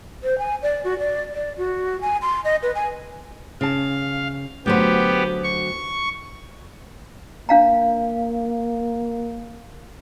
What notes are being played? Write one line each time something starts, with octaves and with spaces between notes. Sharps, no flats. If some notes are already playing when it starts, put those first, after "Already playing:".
C5
G#5
D5
F#4
D5
D5
F#4
G#5
C6
D#5
B4
G#5
C#3 F5 A5
D2 F#3 B3 G4 C5
C#6
A#3 D4 F5 A#5